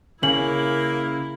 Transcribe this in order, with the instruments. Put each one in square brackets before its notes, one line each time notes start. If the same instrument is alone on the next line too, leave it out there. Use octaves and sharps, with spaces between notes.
[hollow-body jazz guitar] C#3 [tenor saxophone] A#3 [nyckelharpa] E4 [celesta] F#7